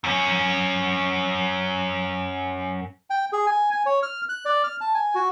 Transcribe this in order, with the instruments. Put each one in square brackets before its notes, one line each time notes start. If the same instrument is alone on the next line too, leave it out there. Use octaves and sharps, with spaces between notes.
[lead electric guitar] F#2 C#4
[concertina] G5
G#4
G#5
G#5
C#5
F6
F#6
D5
F6
A5
G#5
F#4